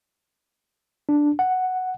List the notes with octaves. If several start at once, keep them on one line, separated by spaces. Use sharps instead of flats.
D4
F#5